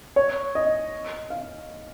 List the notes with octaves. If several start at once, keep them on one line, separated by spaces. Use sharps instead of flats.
C#5
D#5
F5